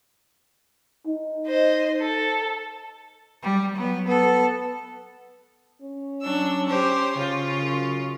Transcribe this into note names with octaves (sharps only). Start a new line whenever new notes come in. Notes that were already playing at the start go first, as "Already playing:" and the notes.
D#4
C5 D#5
A4
G3
F#3 B3
B3 A4
C#4
F#3 D4 E6
G4 C5 C#5
C#3 F4
F#2